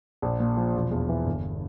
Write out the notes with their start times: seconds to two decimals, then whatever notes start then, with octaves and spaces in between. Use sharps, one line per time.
0.22 A#1
0.40 A#2
0.57 F3
0.75 E1
0.91 E2
1.09 E3
1.27 G1